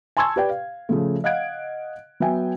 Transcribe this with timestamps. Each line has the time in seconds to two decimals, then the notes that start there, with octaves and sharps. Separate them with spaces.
0.17 G#5 A5 C6 C#6 E6 G#6
0.36 G4 B4 D5 G5
0.50 F5
0.89 C#3 F3 A3
1.24 D#5 F5 F#5 F#6 G#6 D7
2.20 F#3 B3 F#4 E5 G5 G#5